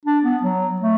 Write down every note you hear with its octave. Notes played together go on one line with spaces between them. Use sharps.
D4
B3
F#3
A3